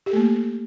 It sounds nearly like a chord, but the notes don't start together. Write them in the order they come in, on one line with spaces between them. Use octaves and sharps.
G4 A4 A3 A#3